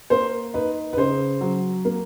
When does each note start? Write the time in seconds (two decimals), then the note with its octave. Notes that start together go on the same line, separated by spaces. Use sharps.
0.10 A#3 C5
0.54 D#4 B4
0.93 B4
0.97 C#3 C5
1.41 F#3
1.85 A#3